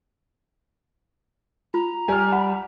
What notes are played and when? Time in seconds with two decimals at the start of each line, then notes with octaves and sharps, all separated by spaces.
1.74 F4 A#5
2.08 G3 G#5 F6
2.32 F#5 B5